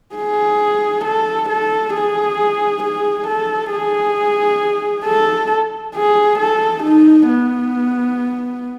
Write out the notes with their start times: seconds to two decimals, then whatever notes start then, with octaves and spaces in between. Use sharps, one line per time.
0.15 G#4
1.04 A4
1.49 A4
1.93 G#4
2.83 G#4
3.27 A4
3.72 G#4
5.05 A4
5.95 G#4
6.39 A4
6.83 D#4
7.28 B3